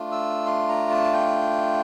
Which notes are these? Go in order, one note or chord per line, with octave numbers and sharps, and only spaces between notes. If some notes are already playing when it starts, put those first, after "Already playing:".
Already playing: A3 D4 F4
E6
C6
A#5
A5
G5